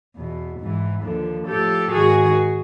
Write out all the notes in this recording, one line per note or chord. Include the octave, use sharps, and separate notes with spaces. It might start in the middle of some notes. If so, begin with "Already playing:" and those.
E2 B2
G#2 E3
D#2 D3 F3
A2 F3 G4 A4
G#2 D#3 F#4 G#4